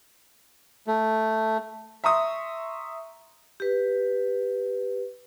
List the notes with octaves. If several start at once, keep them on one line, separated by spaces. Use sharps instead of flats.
A3
E5 A#5 C6 C#6 D#6
G4 B4